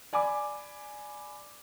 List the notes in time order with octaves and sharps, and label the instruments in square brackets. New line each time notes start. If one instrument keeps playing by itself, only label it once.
[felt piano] D5 G#5 B5 D6